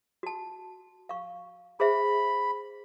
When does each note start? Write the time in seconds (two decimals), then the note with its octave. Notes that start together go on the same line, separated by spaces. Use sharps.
0.23 F#4 A5
1.09 F5 C#6
1.80 G#4 C5 E5 B5